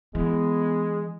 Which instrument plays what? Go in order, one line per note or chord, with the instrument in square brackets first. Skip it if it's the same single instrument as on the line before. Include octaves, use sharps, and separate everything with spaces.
[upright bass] E3 [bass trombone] G#3 [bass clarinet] B3